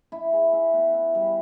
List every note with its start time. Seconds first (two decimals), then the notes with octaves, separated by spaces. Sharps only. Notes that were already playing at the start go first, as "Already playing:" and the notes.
0.12 E4
0.33 G#4
0.53 E4
0.74 B3
0.94 E4
1.15 G3